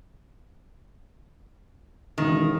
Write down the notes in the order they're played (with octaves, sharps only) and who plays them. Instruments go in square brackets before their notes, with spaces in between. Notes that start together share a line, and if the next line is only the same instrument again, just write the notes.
[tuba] E1 [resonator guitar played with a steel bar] D#3